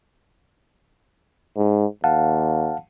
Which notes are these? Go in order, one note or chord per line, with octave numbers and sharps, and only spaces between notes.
G#2
D#2 F5 F#5 A5